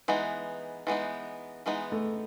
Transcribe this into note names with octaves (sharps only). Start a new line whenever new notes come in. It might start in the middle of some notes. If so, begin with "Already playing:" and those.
E3 G#3 B3 D#4
E3 G#3 B3 D#4
E3 G#3 B3 D#4
A3